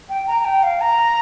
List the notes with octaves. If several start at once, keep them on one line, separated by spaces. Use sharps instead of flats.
G5
A#5
G5
F5
A#5